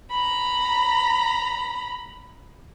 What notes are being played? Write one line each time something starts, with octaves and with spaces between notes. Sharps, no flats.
A#5 B5